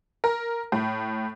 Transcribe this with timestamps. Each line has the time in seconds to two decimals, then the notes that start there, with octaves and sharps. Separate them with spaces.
0.24 A#4
0.72 A2